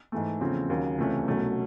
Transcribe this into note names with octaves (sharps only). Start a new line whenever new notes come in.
G#2 E3 A3
E2 C#3 F3 A3 C4
D#2 C#3 F#3
C#2 C3 E3 A3 C#4
C2 B2 F#3 A3 C#4